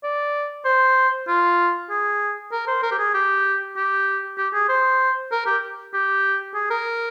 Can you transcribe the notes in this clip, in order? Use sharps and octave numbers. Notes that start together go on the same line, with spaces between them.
D5
C5
F4
G#4
A#4
C5
A#4
G4
G#4
G4
G4
G4
G#4
C5
A#4
G4
G4
G#4
A#4